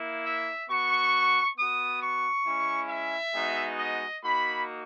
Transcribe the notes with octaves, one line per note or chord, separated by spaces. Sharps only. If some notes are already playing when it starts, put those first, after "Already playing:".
Already playing: A#3 E4
E5
B3 F#4 C#6
B3 F#4 D#6
C#6
G#3 C#4 E4
E5
G#3 B3 D#4 F#4
D#5
A#3 D#4 F#4 B5